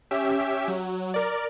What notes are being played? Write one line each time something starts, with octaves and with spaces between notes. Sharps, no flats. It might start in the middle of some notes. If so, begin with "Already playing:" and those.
C#4 G4 E5
F#3
A#4 D5